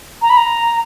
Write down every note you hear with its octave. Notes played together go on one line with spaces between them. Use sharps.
A#5
B5
A#5